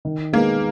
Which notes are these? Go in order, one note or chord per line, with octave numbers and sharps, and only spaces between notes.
D#3
G#3 A#3 B3 D#4 G#4